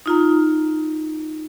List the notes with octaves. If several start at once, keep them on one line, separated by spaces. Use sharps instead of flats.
D#4 F4 A#5